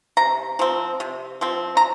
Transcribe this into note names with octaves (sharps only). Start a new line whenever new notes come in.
C3 A#5
F3 C4
C3
F3 C4
A#5